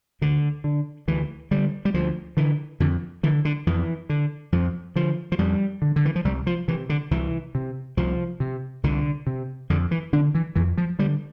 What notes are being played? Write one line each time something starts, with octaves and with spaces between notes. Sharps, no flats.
D2 D3
D3
D2 E3
D3 G3
G3
D2 F3
D3 E3
F2 D3
D3 E3
D3
F2 E3
D3
F2 F3
D3 F3
F3
F2 G3
D3
D3
E3
F3
C2 G3
F3
C3 E3
D3
C2 E3
C3
C2 F3
C3
C2 D3
C3
F2 D3
E3
D3 D4
E3
F2 E3
F3
D3 G3